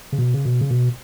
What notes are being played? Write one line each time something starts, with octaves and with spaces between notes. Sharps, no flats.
C#3
B2
C#3
B2
C#3
B2